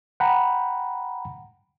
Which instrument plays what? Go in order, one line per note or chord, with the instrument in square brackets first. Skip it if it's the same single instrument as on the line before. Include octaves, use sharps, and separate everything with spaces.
[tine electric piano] F#5 G5 A#5 B5